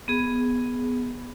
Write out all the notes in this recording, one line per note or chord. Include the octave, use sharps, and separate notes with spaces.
B3 G#4